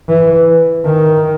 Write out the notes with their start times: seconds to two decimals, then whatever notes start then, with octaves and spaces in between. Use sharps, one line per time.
0.09 E3
0.85 D#3